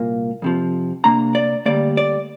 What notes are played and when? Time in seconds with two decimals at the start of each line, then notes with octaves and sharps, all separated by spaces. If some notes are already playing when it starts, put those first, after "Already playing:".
Already playing: C2 A#2 A#3
0.42 F2 C3 F3
1.04 C3 A#3 D4 A#5
1.35 D5
1.66 D2 D3 G3 A#3 D5
1.97 D5